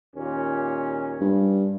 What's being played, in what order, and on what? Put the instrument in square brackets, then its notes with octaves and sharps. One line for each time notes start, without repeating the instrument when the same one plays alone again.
[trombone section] D#2 A#2 C#4
[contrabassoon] G2